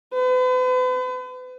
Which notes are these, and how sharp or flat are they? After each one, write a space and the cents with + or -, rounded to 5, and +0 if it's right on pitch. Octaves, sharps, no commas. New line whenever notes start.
B4 +40